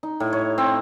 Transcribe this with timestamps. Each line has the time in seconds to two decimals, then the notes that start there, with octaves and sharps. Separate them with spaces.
0.03 D#4
0.20 A2
0.33 C#5
0.58 C4